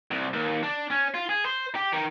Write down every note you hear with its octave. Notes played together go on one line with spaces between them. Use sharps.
C2
D#2
D4
C#4
F4
G#4
C5
G4
D#3